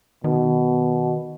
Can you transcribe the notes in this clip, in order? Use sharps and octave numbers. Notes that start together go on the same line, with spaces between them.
B2 D#3